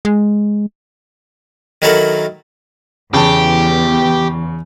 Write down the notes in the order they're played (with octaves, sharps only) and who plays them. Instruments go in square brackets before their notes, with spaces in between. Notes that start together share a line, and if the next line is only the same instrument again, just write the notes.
[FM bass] G#3
[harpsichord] D#3 F#3 E4 F#4 A4 A#4
[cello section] E2 [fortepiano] C#3 A5 [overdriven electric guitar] G4